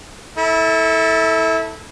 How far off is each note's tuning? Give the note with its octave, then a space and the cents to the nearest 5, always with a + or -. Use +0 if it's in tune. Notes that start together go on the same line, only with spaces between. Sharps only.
E4 -25 A4 +0